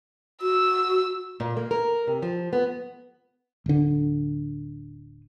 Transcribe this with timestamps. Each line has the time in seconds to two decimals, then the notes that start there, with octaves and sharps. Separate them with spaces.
0.42 F#4 E6
1.40 A#2
1.57 A#3
1.71 A#4
2.07 C3
2.22 F3
2.53 B3
3.66 D1 D3